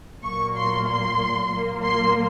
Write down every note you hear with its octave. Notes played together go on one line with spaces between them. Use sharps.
A#2 F#3 A#3 C#6
C6
C6
A#2 F#3 A#3
C6